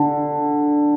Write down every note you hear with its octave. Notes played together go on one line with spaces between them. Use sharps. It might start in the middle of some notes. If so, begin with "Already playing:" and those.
Already playing: D3